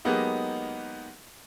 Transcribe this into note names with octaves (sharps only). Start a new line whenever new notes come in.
F#3 G#3 A#3 B3 D#4 G4